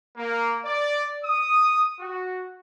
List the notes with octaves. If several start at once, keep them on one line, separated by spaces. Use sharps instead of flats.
A#3
D5
D#6
F#4